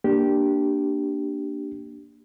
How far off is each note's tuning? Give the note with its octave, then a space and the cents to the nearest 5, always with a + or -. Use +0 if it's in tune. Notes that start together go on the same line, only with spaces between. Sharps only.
A#3 +0 D4 +0 G4 -10